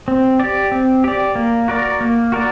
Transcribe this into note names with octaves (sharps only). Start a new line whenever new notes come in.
C4
G4 D5
C4
G4 D5
A#3
F#4 A#4 D5
A#3
F#4 A#4 D5